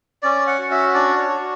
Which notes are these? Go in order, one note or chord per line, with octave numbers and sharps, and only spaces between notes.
C#4 D5
F#5
F#4
E5
D4 D5
C#5
F#4